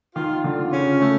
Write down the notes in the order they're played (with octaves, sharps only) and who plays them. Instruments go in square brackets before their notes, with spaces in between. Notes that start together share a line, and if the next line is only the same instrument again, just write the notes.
[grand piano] D#3 [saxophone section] F4
[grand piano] D3 [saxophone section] F4
[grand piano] C#3 [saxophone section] C#4
[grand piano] C#3 [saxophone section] A3